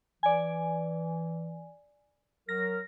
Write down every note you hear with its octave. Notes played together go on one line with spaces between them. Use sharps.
E3 D5 G#5
F#3 A#4 A#6